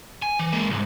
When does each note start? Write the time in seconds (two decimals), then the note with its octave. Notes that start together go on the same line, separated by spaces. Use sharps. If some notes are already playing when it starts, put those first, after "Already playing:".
0.22 G#5
0.39 E3
0.52 G#3 A#3
0.69 C2 G#2